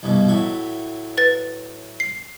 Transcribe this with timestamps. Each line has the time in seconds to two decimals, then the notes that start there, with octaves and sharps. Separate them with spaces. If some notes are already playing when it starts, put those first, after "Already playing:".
0.03 C2 G2 B2
0.29 A2 F#3 E5
1.17 B4 A6
2.00 C7